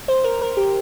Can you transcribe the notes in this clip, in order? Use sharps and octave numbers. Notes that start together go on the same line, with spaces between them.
C5
A#4
A#4
G4